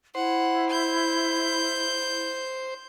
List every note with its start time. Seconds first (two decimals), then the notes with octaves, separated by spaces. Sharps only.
0.15 E4 C5 F#5
0.70 G6